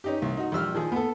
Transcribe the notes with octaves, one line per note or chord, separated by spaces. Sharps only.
C#4 D#4 G4
C2
D#4 F#4
A#1 G3 E6 F6
D#3 F3 G#4
B3 A4